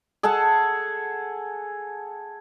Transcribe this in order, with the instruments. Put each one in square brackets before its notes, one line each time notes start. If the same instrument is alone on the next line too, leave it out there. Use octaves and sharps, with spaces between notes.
[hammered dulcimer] G#4 A4 F#5 A5